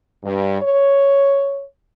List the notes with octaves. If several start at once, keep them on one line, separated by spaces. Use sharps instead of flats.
G2
C#5